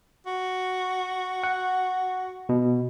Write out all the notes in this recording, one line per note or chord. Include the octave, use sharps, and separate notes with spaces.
F#4
F#5
B2